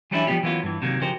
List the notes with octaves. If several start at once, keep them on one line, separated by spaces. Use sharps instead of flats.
E3 F#3 G3 C#4 D4 E4
F3 G3 A#3 B3 F4 G4
E3 F#3 A#3 B3 C#4 F4
G2 E3
C3 D#3 F#3 A#3
C#3 F3 F#4 G4 A#4 C5